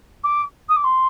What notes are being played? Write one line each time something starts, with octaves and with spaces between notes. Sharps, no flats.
D6
D#6
D6
C6